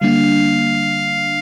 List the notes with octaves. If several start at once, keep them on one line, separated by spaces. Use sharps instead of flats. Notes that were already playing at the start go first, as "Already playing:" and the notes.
D3 G3 A#3 D4 F5